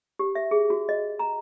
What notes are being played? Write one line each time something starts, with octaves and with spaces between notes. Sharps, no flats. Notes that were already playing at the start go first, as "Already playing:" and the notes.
G4
E5
G#4
F#4
D#5
A#5